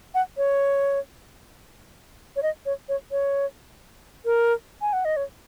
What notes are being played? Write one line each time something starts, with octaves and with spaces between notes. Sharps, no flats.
F#5
C#5
C#5
D#5
C#5
C#5
C#5
A#4
G#5
F#5
D#5
C#5